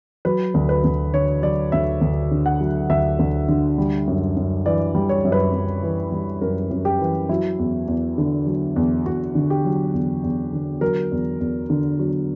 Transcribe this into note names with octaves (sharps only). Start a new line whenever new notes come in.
F#3 B4
D2
B4
D2
D3 C#5
F#3 D5
D2 E5
D2
D3
F#5
F#3
D2 E5
D2
D3
G3
F#2
F#2
E3 D5
G3
C#5
F#2
B4
F#2
E3
G3
F#2 A#4
F#2
G4
E3
F#3 E4
E2
E2
D3
F#3
E2
E2 F#4
D3
G4
F#3
E2
E2
D3
F#3 A#4
E2
E2
D3
F#3